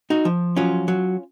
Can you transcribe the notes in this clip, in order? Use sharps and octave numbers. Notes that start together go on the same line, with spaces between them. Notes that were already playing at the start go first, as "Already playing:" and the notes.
D#4 F#4
F3
F#3 C#4 F4
F#3